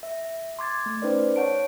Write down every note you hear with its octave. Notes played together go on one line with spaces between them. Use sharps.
E5
C6 D6 G#6 A6
A3
C#4 D#4 B4 C5 D5
C#5 F#5 A5 D7